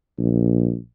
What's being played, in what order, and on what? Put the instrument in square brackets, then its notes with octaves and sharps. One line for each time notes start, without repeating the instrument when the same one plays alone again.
[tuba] A#1